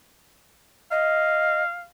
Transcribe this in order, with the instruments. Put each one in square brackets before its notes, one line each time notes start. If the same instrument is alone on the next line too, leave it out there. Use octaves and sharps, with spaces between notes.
[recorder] D#5 [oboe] F5